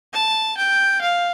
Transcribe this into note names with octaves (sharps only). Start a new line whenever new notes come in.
A5
G5
F5